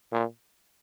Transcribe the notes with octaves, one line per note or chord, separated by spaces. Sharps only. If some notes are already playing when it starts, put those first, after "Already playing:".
A#2